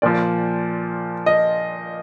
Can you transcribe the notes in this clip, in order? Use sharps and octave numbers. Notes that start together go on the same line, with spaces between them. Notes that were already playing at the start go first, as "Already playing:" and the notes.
A#2 F3 D5
D#5